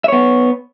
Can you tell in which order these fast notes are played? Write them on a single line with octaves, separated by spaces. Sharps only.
E5 C#5 B3